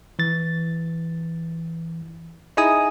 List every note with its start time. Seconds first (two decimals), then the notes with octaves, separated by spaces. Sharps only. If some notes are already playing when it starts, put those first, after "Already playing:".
0.19 E3 A6
2.57 D#4 E4 G#4 D#5 G#5 D#6